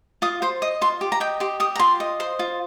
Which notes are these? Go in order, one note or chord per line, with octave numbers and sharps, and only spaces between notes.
F4 D#6
C5 C6
D#5 D#6
F4 C6
G4
A#5
D#5 G5
G4 C6
G4 D#6
A#5
F4 C6
D#5
C5 C6
F4